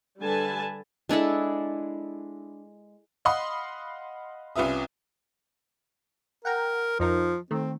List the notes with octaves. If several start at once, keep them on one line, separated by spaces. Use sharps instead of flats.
D3 G3 A4 B4 G#5 A5
G#3 D4 E4 A4
D#5 F5 F#5 B5 C6 D#6
C2 C#4 F4 B4 E5 D#6
A#4 F#5 G5 A#5
F2 F3 D#4 A#4
D#3 A3 C4